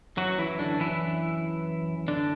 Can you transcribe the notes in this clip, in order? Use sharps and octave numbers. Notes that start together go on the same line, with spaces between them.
F#2 E3 F#3 F#4
E3 E4
D3 D4
E3 E4
D3 D4